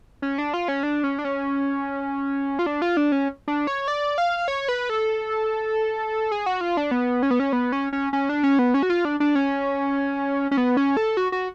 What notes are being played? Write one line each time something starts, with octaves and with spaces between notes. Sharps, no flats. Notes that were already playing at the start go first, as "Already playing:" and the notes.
C#4
D4
F4
C#4
D4
C#4
D4
C#4
F4
D4
F4
D4
C#4
D4
C#5
D5
F5
C#5
B4
A4
G#4
F#4
F4
D4
B3
C#4
B3
C#4
B3
C#4
C#4
C#4
D4
C#4
B3
C#4
F#4
F4
D4
D4
C#4
C#4
B3
C#4
A4
F#4
F#4